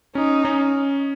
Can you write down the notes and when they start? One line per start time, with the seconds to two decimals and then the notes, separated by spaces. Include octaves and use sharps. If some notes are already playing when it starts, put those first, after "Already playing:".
0.15 C#4 D#4
0.45 C#4